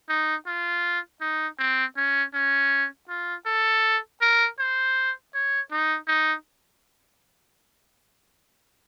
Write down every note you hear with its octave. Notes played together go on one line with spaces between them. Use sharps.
D#4
F4
D#4
C4
C#4
C#4
F4
A4
A#4
C5
C#5
D#4
D#4